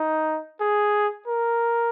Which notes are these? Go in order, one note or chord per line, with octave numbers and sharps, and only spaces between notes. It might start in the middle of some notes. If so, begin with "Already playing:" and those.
Already playing: D#4
G#4
A#4